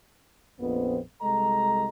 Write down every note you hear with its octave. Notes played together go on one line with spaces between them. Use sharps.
A#1 F2 B3 C4
C2 G#3 A4 D#5 A#5